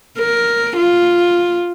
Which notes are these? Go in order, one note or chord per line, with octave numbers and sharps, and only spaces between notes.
A#4
F4